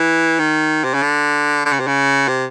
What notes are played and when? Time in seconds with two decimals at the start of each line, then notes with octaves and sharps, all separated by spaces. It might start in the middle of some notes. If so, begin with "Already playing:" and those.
Already playing: E3
0.40 D#3
0.84 C3
0.94 C#3
1.03 D3
1.66 D3
1.73 C#3
1.80 C3
1.88 C#3
2.28 C3